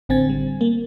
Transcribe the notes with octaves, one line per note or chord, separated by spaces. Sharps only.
A1 D3 C4 G#5 A6
G3
A#3